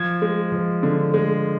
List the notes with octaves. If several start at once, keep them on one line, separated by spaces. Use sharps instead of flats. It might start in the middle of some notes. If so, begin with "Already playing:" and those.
Already playing: F3 G#6
G#3
F3
D3
G#3